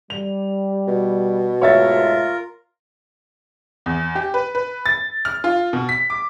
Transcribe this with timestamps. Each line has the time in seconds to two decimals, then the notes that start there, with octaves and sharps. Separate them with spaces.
0.10 G3 F7
0.88 B2
1.62 G#2 G#3 A3 F4 A#4 C#5 E5 A6
3.86 E2
4.15 G4
4.34 B4
4.55 B4
4.86 A6
5.25 F6
5.44 F4
5.73 B2
5.89 B6
6.10 D6